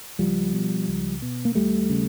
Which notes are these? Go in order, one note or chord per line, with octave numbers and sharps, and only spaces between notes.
C#2 F3 G3
B2
C#2
B2
A#3
D#2 G3 A3
C#3